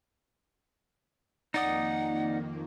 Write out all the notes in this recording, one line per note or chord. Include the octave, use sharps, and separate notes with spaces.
F2 D#3 A#3 D#4 D5 F#5 D#6